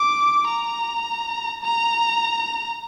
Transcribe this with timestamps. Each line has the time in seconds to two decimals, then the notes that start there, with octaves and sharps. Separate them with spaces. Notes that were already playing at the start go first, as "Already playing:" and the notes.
Already playing: D6
0.47 A#5
1.63 A#5